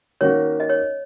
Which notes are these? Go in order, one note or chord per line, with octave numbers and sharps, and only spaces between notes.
D#3 A#3 C#4 F#4 C#5
D#5
C#5